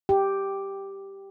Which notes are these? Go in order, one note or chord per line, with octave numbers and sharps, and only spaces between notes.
G4